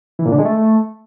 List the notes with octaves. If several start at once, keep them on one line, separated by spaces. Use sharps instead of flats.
E3
A#2
D3
G#3
A3